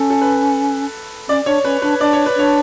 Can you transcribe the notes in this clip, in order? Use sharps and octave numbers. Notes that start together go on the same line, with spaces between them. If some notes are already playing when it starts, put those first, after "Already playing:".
Already playing: C#4 A4
A4
B4
C#4 D5
D4 C#5
C#4 B4
D4 B4
D4 D5
C#5
B4
D4 C#5